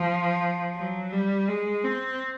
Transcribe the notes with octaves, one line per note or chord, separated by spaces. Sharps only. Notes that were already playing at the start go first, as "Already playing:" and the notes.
Already playing: F3
F#3
G3
G#3
C4